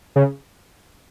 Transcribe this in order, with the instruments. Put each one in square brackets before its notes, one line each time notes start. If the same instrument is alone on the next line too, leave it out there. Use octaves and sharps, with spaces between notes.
[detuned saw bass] C#3